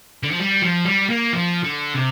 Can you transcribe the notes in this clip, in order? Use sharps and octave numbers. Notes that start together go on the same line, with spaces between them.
D3
F3
G3
F3
G3
A#3
F3
D3
C3